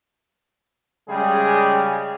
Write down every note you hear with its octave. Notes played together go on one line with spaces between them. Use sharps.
C#3 G3 G#3 G#4